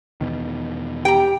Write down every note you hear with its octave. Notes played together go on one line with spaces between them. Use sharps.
E2 B2 D#3
G4 G5 A#5